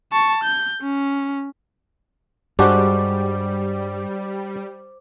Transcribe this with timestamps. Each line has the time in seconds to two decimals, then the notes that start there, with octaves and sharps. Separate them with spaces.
0.12 A5 C#6
0.44 G6
0.82 C#4
2.59 G2 G3 G#3 D4 F#4 C5 D6